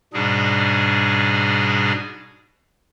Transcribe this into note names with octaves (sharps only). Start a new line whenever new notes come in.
G#2 B2 G3 D4 G#4